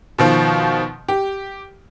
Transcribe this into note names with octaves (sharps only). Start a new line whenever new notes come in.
B2 D#3 F3
G4